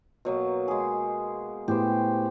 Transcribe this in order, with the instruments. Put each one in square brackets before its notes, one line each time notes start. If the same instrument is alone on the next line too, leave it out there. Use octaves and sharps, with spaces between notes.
[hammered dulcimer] B2 F#3 A#3
G#3 G#4
[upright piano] A2 B3 [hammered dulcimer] G4 C5